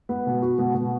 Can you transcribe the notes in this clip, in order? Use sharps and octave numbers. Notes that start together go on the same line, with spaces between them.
B3
B2
F#4
B2
B2